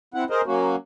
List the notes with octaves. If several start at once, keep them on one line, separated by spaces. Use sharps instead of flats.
C4 E4 F#5
G#4 A#4 C5 D#5
F#3 A#3 C#4 F#4